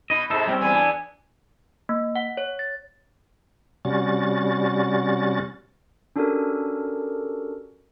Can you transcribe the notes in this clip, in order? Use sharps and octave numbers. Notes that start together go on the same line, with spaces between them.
B2 D#4 D#5
G#2 C3 D#4 A4 C5 E5
G3 C4 C#4 G5
E2 B3 G#5
D4
A#3
F#5
C#5
A6
C3 G3 C#4 F#4 A6
C#4 D4 F#4 G4 A4 A#4